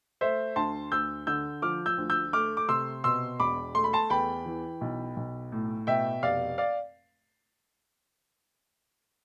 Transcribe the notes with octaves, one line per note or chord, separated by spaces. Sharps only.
A3 C5 E5
D2 A5 C6
D2 E6 G6
D3 E6 G6
F3 D6 F6
E6 G6
D2
E6 G6
A3 D6 F6
D6
C3 C6 E6
B2 C6 E6
E1 B5 D6
A3 C6
B5
A5 C6
E2 G5 B5
E3
B1
B1
A2
B2 E5 G5
F1 D5 F5
D5 F5